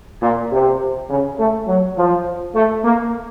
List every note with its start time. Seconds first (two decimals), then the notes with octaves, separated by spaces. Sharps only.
0.22 A#2
0.51 C3
1.10 C#3
1.39 A3
1.67 F#3
1.97 F3
2.55 A3
2.84 A#3